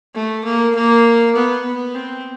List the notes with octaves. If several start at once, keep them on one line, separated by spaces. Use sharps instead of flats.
A3
A#3
A#3
B3
B3
C4